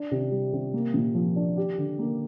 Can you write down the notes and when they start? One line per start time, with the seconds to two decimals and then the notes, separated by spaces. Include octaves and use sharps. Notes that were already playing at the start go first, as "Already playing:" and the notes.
Already playing: D4
0.11 C3
0.31 G3
0.53 C3
0.74 A#3
0.94 A#2
1.15 F3
1.36 D4
1.57 G4
1.78 D3
1.99 A#3